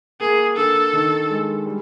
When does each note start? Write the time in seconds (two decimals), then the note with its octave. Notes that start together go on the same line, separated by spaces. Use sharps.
0.20 A#3 G#4
0.57 D3 A4
0.93 D#3
1.30 G#3
1.66 G3